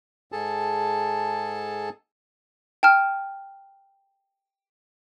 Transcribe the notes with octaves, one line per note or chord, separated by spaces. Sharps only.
G#2 G#4 A4 A5
G5 A5 F6